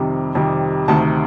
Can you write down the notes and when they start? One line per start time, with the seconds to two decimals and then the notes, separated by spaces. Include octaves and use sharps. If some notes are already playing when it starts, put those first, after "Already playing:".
Already playing: F2 C3 D#3 G3
0.35 F2 C3 D#3 G3
0.88 D2 C3 D#3 A5